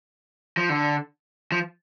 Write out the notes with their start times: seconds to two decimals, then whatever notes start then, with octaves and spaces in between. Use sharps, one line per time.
0.57 F3
0.69 D3
1.52 F3